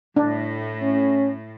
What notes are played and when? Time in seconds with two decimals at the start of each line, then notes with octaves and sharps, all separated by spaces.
0.16 A2 D4
0.82 C#4